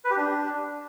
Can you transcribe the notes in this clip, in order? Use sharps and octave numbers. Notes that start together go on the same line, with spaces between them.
B4
G4
D4